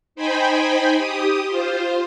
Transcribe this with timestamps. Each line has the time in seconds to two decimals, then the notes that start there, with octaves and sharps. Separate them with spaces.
0.15 D#4 C5 G5 G#5 B5
0.97 G4 D#6
1.47 F4 C5